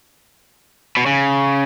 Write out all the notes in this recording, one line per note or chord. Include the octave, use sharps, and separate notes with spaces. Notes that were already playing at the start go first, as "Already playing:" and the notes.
B2
C#3